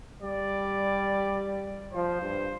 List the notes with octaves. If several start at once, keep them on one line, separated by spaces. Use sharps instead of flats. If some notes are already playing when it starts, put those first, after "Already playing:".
G3 D5
F3 C5
G2